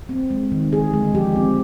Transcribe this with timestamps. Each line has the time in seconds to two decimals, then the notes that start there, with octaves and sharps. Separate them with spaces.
0.09 C4
0.31 G#3
0.52 D#3
0.72 D3 G#4
0.94 G#3
1.15 F3 G4
1.36 C4